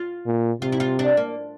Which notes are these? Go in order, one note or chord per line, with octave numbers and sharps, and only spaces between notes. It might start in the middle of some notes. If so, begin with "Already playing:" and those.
Already playing: F4
A#2
C3 F4
E4
F4
D4
A#3